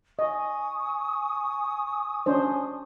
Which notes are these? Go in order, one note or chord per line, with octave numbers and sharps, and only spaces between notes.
D#5 G#5 C#6 D#6
C#4 D4 C5